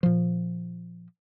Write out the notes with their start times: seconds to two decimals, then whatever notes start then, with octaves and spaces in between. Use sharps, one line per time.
0.03 A#2 F3